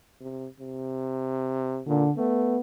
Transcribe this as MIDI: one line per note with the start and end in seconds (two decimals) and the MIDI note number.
0.20 0.46 48
0.60 1.81 48
1.87 2.06 46
1.87 2.11 50
2.17 2.56 57
2.17 2.60 59